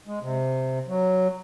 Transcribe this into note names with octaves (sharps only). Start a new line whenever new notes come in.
G#3
C3
F#3